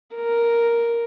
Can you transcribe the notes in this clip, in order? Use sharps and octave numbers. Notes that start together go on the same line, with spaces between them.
A#4